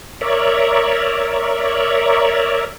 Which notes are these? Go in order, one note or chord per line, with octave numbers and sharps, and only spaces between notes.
A#4 C#5 D5 E5